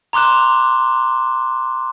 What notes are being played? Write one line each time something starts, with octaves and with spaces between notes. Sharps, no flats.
A#5 C6 D6 F#6 E7